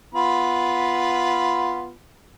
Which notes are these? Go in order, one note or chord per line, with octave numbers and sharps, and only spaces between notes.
B3 F4 B5